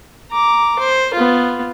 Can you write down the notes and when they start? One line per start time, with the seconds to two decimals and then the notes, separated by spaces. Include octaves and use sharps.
0.31 A#5 D6
0.79 C5
1.14 B3 F4